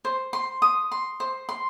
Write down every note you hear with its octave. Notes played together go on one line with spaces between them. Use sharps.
C5
C6
D#6
C6
C5
C6